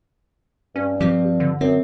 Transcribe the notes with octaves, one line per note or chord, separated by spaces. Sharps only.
G2 C#4
F3 C4 G4
D3
F#2 C4